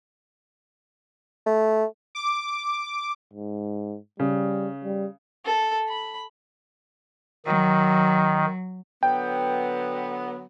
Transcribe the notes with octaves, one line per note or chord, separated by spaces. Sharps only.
A3
D6
G#2
C#3 G3
G3
A4
B5
D#3 F#3
D3 F#3 B3 G5